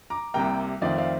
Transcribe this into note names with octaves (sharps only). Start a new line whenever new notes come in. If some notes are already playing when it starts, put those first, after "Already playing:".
A#5 D6
C2 C3 G3 A#3 G5 A#5
F2 D#3 A3 C4 D5 F5
D5 F5